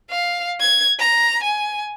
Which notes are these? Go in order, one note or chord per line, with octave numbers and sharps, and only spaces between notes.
F5
G#6
A#5
G#5